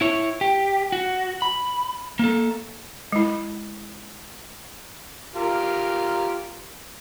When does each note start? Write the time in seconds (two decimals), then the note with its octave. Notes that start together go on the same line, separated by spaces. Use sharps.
0.01 E4 C#5
0.41 G4
0.92 F#4
1.42 B5
2.19 A#3 A4
3.12 G#3 E4
5.36 F4 G4 A#4